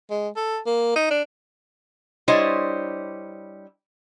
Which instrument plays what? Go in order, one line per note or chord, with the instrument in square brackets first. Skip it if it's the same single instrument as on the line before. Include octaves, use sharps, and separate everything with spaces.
[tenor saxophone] G#3
A4
A#3
D#4
D4
[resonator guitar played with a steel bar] G3 D4 E4 C5 C#5 D#5